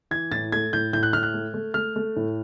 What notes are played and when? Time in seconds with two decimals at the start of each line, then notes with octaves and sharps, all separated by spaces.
0.11 E3 G#6
0.31 A2 A6
0.52 A3 G#6
0.73 A2 G6
0.93 A2 G6
1.03 F#6
1.13 A2 F6
1.23 F#6
1.34 A3
1.54 A3
1.74 A3 F6
1.96 A3
2.16 A2